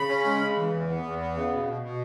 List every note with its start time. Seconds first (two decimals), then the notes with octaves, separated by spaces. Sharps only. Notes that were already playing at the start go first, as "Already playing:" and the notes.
Already playing: C#3 B5
0.09 C#4
0.25 G#3
0.40 C#3
0.56 E3
0.72 E2
0.88 B3
1.02 E2
1.19 B3
1.35 C#3
1.51 B2
1.65 B2
1.82 B2